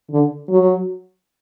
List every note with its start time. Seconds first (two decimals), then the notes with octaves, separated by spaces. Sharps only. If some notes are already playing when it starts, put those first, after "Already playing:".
0.11 D3
0.49 F#3